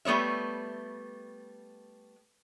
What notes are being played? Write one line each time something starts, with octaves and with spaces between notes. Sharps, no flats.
G3 A3 B3 C#5 E5